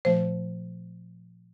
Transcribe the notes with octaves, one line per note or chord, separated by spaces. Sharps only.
A#2 F3 A3 C5